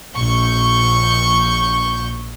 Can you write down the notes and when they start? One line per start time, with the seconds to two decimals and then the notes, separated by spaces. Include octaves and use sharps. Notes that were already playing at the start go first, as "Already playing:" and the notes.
0.14 A#1 C#6 G6